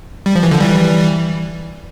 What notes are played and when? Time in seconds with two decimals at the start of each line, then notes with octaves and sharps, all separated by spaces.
0.26 G3
0.35 F3
0.43 E3
0.51 D3 F3
0.60 E3 G3